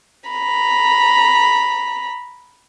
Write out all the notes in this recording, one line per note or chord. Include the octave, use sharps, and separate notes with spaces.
A#5 B5